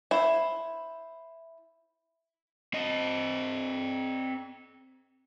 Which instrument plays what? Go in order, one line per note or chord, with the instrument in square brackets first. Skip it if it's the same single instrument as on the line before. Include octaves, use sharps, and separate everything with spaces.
[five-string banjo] E4 C5
[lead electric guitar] C4 D#5